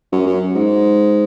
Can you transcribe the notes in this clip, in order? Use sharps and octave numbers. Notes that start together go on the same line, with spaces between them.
F#2
F#2
G#2